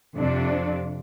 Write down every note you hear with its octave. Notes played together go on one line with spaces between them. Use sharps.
F2 C3 D4